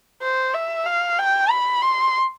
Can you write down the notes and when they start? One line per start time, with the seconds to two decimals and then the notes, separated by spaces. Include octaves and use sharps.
0.22 C5
0.54 E5
0.86 F5
1.19 G5
1.50 B5
1.82 C6